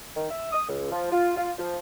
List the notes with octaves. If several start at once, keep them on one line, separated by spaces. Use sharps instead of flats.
D#3
E5
D#6
C#2
F3
F4
F4
F3